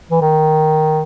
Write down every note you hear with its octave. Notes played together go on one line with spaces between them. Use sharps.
E3
D#3